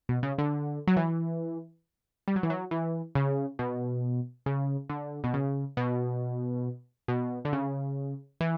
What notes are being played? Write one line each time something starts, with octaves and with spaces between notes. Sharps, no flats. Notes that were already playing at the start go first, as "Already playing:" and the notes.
B2
C#3
D3
F#3
E3
G3
F#3
E3
F#3
E3
C#3
B2
C#3
D3
B2
C#3
B2
B2
D3
C#3
E3